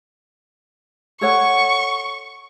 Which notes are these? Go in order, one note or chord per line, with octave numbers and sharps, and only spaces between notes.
A4 C#5 F#5 C#6